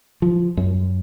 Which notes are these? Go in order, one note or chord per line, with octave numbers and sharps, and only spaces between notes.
F3
F#2